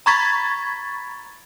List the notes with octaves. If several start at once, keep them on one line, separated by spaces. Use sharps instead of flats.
A#5 B5 C#6 G#6 A6 B6